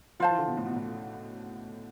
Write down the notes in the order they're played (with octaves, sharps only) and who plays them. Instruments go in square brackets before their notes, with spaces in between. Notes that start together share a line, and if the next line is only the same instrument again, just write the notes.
[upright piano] F3 [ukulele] F4 C5 F5 A5
[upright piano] E3
D3
B2
A2
B2
A2